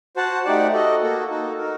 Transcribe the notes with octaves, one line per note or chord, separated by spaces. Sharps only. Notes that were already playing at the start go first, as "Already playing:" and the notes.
F#4 C5 F#5 A5
A3 D#4 G4 D5 F#5
F#4 A4 D#5
A#3 F#4 A4
D#4 F#4 A4
D#4 F#4 A#4